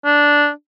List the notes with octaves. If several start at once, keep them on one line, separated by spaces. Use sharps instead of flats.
D4